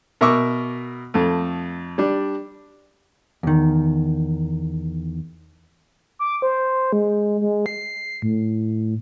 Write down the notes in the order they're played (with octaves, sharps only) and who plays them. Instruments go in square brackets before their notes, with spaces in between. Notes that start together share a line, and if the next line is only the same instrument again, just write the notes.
[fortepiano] B2 A#4 E5 C#6 D6 E6
F2 A3
G3 D4
[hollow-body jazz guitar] E2 D#3
[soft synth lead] D6
C5
G#3
G#3
C7
A2